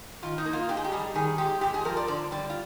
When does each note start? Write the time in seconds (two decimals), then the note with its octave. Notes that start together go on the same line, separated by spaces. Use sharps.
0.22 D#3 F4
0.38 D#4
0.45 A#3
0.53 F4
0.69 D#4 G4
0.77 G#4
0.84 G4
0.92 G3 G#4
1.15 D#3 G#4
1.38 G#3 G4
1.61 G#2 G4
1.74 G#4
1.85 F3 A#4
1.97 D5
2.08 D3 D5
2.31 G3 D5
2.50 F4